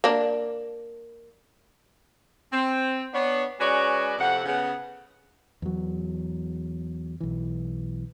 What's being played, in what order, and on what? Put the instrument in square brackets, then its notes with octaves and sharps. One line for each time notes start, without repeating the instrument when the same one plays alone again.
[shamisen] A#3 D4
[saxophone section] C4
B3 D4 C#5
G#3 C#4 F#4 B4 C#5 D5
F2 C3 F#5
C#3 B3 F#5
[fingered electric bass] E2 F#3
B1 E3